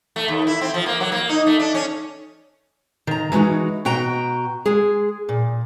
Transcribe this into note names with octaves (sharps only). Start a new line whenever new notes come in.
A3
D#2
E4
C4
F3
A#3
F#3
A#3
D#4
A3
D4
C#4
D#3 A#5
E3 G#3 D#4 F#4
B2 F#4 G5 A#5
G#3 G#4
A#2